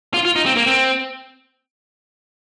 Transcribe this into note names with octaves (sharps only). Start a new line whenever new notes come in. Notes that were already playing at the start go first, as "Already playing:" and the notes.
F4
F4
D#4
C4
A#3
C4